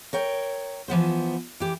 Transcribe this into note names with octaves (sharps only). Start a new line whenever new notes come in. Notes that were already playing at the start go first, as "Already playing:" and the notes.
A#4 C#5 G5
E3 F3 B3 C5
E3 G4